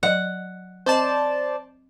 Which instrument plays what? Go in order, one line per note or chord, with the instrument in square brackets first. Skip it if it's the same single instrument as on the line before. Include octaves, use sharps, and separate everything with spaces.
[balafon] F#3 D5 D#5 [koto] F#5
[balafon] C4 D#5 [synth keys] C5 D5 A5